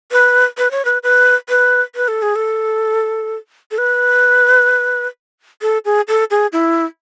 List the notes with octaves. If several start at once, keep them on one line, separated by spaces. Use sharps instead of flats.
B4
B4
C#5
B4
B4
B4
B4
A4
G#4
A4
A4
B4
A4
G#4
A4
G#4
E4